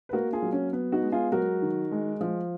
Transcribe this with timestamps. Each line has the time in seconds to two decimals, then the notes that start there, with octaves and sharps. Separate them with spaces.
0.09 B4
0.13 A#3 F#4 A#4
0.33 F4 G#4
0.42 F#3
0.52 C#4
0.73 B3
0.92 D#4 F#4
1.02 G#3
1.12 F4 G#4
1.32 F#3 F#4 A#4
1.62 D#3
1.92 G#3
2.21 F3